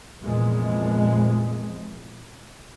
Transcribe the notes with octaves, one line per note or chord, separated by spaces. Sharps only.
F1 E2 A#2 F3 G#3